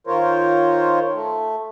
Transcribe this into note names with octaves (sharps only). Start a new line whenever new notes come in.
D#3 F4 A#4 C5 C#5
A3